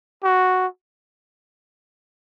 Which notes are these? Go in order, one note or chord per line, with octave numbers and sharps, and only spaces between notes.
F#4